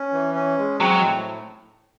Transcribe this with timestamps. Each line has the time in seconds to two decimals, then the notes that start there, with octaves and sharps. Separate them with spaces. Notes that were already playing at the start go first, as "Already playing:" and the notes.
Already playing: C#4
0.13 E3
0.35 C#4
0.58 G#3
0.80 F#3 C4
1.03 A2